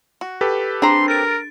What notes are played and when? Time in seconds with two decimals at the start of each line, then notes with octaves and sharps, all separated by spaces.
0.21 F#4
0.41 G4 A4 B4
0.82 C4 D4 A#5 C6
1.08 A#4 A6 D7